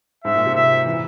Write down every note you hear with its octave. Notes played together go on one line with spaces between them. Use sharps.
G#2 E5
A#2
C3
E5
E3